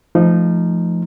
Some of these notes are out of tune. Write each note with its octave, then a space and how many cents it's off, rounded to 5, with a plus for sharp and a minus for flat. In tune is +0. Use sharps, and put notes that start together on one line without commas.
F3 -15 A3 -10 D#4 -5